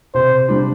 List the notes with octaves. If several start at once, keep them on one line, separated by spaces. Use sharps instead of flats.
C3 C5
G3 D4